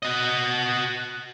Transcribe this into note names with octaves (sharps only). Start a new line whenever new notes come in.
F#4 D#5